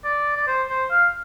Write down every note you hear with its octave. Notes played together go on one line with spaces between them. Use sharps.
D5
D5
C5
C5
F5